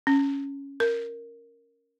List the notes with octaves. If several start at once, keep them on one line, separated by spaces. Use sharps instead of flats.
C#4
A#4